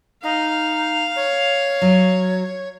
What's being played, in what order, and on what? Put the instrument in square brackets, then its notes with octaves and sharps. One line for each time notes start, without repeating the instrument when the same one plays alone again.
[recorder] D#4 [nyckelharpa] F5
[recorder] C#5
[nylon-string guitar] F#3